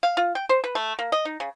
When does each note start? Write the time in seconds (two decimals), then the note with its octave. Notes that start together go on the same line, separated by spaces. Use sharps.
0.03 F5
0.17 F4
0.35 G5
0.49 C5
0.64 B4
0.75 A3
0.99 A#3
1.12 D#5
1.25 D#4
1.40 C#3